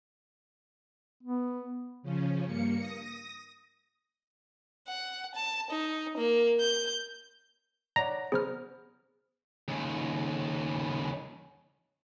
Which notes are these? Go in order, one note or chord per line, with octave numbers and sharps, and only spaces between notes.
B3
C#3 F3 C#4
G2 A#3 C#7
D#6 A#6
F#5
A5
D#4
A#3
G6
C#5 D5 F#5 A#5
B3 G#4 C5 F6
D#2 C#3